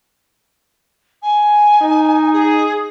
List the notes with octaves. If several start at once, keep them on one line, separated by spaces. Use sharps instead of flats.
G#5
D#4
G#4